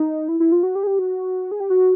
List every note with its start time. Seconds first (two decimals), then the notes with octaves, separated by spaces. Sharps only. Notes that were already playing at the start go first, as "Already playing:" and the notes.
Already playing: D#4
0.28 E4
0.40 E4
0.52 F4
0.63 F#4
0.75 G4
0.83 G#4
0.87 G4
0.99 F#4
1.51 G#4
1.60 G4
1.70 F#4